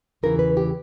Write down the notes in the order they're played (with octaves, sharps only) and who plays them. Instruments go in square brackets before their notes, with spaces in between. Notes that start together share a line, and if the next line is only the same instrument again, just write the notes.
[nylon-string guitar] E2 C#3 E3 A#4
B4
G4